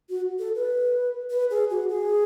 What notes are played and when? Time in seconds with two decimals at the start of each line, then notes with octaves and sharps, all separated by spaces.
0.10 F#4
0.39 A4
0.55 B4
1.30 B4
1.51 G#4
1.70 F#4
1.89 G#4